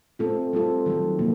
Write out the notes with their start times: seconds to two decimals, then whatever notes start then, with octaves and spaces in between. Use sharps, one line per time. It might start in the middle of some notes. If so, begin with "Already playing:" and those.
0.19 A3 C4 F4 A4
0.53 G3 C4 F4 A4
0.86 D#3 F#3 A3
1.19 C3 F3 A#3